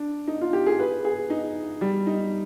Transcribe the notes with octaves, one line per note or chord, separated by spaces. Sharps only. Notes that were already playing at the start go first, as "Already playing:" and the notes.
Already playing: D4
D#4
F4
G4
G#4
B4
G#4
D#4
G3
D#4